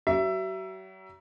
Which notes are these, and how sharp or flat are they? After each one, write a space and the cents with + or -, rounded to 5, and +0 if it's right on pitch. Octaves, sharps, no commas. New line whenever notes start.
F#3 +40 E5 +20